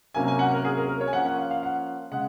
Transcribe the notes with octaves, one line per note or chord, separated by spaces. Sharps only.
C3 F#3 A#3 C#4 G#5
G#5
F#5
A#4
G#4
A#4
A#4
C#5
G#5
F3 A#3 C#4 F#5
F#5
F5
F5
F#5
C#3 G#3 F#5